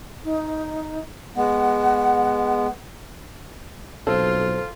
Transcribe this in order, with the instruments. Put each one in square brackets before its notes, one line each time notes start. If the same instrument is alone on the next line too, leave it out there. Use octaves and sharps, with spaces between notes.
[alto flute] D#4
[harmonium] G#3 B3 [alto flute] F#5
[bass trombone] B1 [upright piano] C4 [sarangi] F4 [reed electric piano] A4